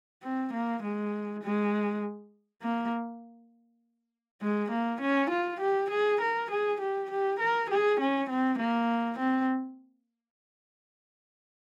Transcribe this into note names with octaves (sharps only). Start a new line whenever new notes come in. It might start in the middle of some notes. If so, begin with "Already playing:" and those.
C4
A#3
G#3
G#3
A#3
G#3
A#3
C#4
F4
G4
G#4
A#4
G#4
G4
G4
A#4
G#4
C#4
C4
A#3
C4